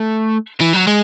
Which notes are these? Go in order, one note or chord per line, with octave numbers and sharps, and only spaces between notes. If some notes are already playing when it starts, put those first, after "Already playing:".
Already playing: A3
E3
F#3
G#3